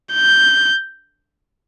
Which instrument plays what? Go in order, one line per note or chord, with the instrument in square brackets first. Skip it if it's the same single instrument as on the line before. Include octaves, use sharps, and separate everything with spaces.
[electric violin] G6